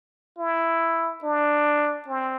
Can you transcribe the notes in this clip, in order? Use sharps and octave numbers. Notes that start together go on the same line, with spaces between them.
E4
D4
C4